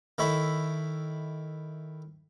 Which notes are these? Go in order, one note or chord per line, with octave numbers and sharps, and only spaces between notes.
D#3 E4 A4 C#5 B5